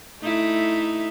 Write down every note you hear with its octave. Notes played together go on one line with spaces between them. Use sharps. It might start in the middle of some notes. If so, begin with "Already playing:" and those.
A3 D#4 E4